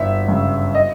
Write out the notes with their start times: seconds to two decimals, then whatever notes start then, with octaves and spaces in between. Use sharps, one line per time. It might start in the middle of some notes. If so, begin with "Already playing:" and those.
Already playing: G1 E5
0.29 F#2 C#3
0.75 D#5